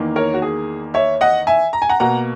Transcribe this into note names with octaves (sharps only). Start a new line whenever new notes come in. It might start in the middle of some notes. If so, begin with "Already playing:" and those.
Already playing: E2 D#3 A#3
A#4 C#5
F#4
G#4
C#5 E5
D#5 F#5
E5 G#5
A#5
G#5
F#5 A#5
B2 A#3 F#5 A#5